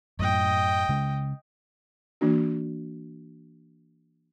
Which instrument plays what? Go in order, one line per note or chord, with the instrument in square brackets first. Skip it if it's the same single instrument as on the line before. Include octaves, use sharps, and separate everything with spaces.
[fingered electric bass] F#2 A2 [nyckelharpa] D#5 G5
[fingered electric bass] C#3 G#3
[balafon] E3 A#3 D4 F#4